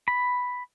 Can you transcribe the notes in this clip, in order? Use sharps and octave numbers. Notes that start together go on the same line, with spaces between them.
B5